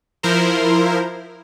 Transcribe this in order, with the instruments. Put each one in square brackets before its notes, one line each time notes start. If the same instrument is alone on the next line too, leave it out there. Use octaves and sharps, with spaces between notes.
[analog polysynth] F3 E4 A#4 C5